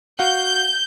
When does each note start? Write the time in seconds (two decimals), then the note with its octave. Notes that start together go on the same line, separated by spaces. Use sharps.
0.19 F#4 F5 F#5 G6